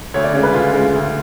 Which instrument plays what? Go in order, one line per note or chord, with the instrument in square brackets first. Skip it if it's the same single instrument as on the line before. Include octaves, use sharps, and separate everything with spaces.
[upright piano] D2 C#5
D5
C#3 G#3 C#5
B4
D2 F4
C#3 G#3
D2